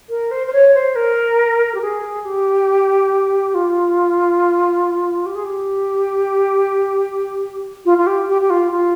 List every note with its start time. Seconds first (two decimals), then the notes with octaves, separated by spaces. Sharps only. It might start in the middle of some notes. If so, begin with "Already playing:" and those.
0.09 A#4
0.31 C5
0.47 C5
0.53 C#5
0.74 C5
0.95 A#4
1.75 G4
1.81 G#4
2.25 G4
3.54 F4
5.26 G4
5.35 G#4
5.44 G4
7.85 F4
7.98 F4
8.07 G4
8.28 G4
8.41 G4
8.50 F4
8.72 F4